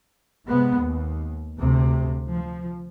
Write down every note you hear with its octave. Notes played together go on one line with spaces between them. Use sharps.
C3 G#3 B3
D#2
D2 C3
F3